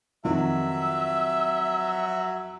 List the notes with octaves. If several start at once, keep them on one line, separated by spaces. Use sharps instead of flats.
F2 D#3 F3 F#3 E5